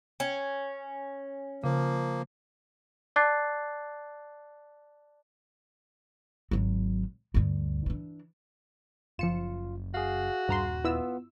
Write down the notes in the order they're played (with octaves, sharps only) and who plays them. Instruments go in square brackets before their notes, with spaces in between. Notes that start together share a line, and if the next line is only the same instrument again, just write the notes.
[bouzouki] C#4
[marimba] C#3 [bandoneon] F3 A#3
[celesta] D5 A5 D6 F#6 A6 C7
[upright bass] G#1 F#3
D2 G2
E3 D4
[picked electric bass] F#1 [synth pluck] F3 C#7 E7 [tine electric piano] F4
[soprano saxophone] F#4 [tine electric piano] G#4 F5
[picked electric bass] D#1 [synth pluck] G2 A#5 C6
[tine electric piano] B3 F4 [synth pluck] E4 E6